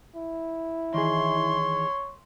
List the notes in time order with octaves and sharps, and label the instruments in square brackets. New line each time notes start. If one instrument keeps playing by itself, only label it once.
[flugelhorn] E4
[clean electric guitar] D#3 E3 G#4 [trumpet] C#5 [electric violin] C6